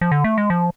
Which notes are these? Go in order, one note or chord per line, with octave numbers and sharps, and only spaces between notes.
F3
D3
A3
G#3
F3